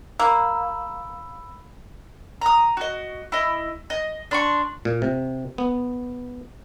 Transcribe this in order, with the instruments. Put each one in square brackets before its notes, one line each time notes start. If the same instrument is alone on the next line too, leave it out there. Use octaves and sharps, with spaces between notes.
[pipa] A#3 [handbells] B5 E6
[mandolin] A#5 D#6
F#4 D#5
E4 D#5
D#5
D4 C6 C#6
[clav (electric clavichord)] A#2
C3
B3